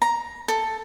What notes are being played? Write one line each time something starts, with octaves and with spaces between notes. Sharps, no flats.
A#5
A4